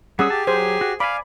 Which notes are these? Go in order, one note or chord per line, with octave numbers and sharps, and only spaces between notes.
G3 C#4 G#4 F#5 D#6 E6
G4 A5
F#3 G#4 C5
F#4
D5 F5 G#5 B5